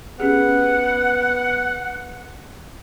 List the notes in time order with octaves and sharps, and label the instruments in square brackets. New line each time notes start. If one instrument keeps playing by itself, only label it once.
[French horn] B3 [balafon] C#4 G4 G#4 [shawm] F#5